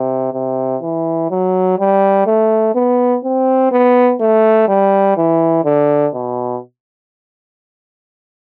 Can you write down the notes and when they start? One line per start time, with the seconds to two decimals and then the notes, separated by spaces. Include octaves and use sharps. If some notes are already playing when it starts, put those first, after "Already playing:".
Already playing: C3
0.33 C3
0.82 E3
1.30 F#3
1.79 G3
2.26 A3
2.75 B3
3.24 C4
3.71 B3
4.20 A3
4.68 G3
5.17 E3
5.65 D3
6.14 B2